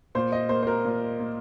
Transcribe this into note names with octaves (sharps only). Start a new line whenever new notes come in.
A#2 C5
D#5
A#3 C5
C5
A#4
A#2
A#3